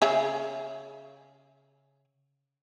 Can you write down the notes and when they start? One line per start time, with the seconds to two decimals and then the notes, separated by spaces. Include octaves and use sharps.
0.02 C#3 G#4 E5